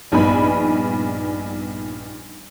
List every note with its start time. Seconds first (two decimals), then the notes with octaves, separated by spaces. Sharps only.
0.12 A#1 G2 B3 D#4 G#5 B5